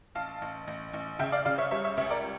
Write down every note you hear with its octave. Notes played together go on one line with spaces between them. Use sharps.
A1 F5 A5
A1
A1
A1
C#3 E5 G5
D5 F5
C#3 D5 F5
C#5 E5
G3 C#5 E5
C#5 E5
C#2 C#5 E5
A#4 D5